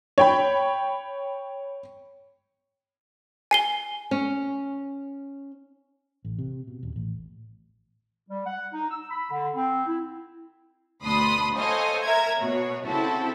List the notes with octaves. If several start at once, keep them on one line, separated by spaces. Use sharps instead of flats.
C#5 G5 B5
G#5 C7 G7
C#4
A1
C3
B2
D#1
A1
G3
F#5
D#4
E6
B5
D3
C4
E4
D2 B2 D4 B5 C6 D#6
A4 C5 C#5 D#5 F5 G#5
A#4 E5 A#5 G#6
B2 F#4 C#5
C#3 C4 E4 F#4 A4